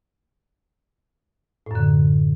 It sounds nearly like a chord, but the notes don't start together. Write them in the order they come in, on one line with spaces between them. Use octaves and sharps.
A2 F#2 D3